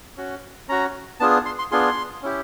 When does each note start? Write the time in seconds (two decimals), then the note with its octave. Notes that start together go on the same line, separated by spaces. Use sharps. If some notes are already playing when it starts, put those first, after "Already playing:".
0.17 C#4 F#4
0.68 C#4 F#4 A#5
1.20 B3 D4 F4 G#4 A5
1.46 C6
1.59 C6
1.72 B3 D4 F4 G#4 C6
2.23 C#4 E4 G4